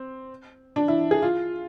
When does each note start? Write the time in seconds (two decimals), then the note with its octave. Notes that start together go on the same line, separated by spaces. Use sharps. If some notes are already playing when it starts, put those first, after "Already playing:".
Already playing: C4
0.76 D4
0.88 E4
1.11 G#4
1.22 F4